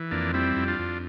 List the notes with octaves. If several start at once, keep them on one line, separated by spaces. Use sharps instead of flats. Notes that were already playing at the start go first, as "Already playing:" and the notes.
Already playing: E3
F2 A#3 D4
G3 C4 E4
F2
D4 F4
F2